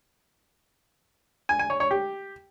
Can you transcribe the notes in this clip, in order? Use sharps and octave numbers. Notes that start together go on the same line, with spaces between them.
G#5
G#5
C#5
C#5
G4